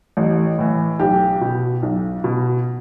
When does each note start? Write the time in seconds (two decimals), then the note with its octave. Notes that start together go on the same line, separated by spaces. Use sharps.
0.17 A1
0.58 A2 E3
0.99 B1 G4
1.41 B2
1.82 B1
2.24 B2